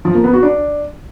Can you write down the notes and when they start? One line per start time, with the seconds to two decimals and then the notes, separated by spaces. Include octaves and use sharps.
0.05 F3
0.14 A#3
0.24 B3
0.33 F#4
0.43 D4